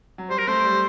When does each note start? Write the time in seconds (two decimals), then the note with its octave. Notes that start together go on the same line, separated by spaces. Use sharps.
0.18 F#3
0.29 G3 C5
0.38 A#4
0.48 A3 C5
0.64 G3